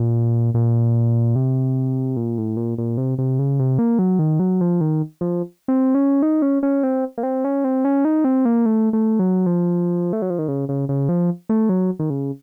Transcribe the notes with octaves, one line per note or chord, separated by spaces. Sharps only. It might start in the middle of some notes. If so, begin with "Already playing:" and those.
Already playing: A#2
A#2
C3
A#2
A2
A#2
A#2
C3
C3
C#3
C3
A#3
F#3
D#3
F#3
F3
D#3
F3
C4
C#4
D#4
C#4
C#4
C4
A#3
C4
C#4
C4
C#4
D#4
C4
A#3
A3
A3
F#3
F3
A3
F#3
F3
D#3
C#3
C#3
C#3
F3
A3
F#3
D#3
C#3